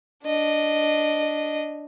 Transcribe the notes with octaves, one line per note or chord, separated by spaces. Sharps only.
D4 D#5